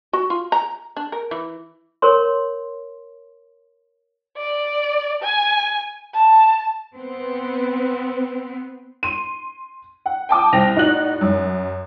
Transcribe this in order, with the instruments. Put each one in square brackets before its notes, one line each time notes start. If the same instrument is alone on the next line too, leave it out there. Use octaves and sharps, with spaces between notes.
[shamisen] F#4
F4
A#5
D4
A#4
E3
[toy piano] A#4 C#5 C6
[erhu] D5
G#5
A5
[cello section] B3 C4
[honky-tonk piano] C6 D#7
F#5
G5 A5 D6 D#6
C2 C4 G5 A#6 F7
A2 D#4 F#4 D5 F#6 F#7
F#2